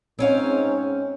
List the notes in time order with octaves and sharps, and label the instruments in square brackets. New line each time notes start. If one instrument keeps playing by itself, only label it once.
[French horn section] G#2 C#5 [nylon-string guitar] C4 C#4 F5